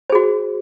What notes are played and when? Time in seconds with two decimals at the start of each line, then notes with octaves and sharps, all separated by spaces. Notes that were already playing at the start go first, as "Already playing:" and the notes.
0.10 C5
0.12 G#4
0.15 F#4